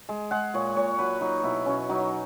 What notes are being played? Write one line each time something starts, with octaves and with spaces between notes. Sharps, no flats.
G#3
G#3 F#5
A#2 C#5
A#2 C#5
F#3 B4
F#3 D#4
B2 E4
B2 C#4
F#3 D#4